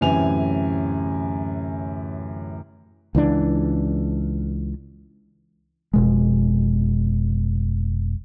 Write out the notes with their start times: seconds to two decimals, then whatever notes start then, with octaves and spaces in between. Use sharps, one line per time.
0.01 D1 F#2 C3 E3 G#5 F7
3.15 C#2 E3 D4
5.93 F1 B2 G#3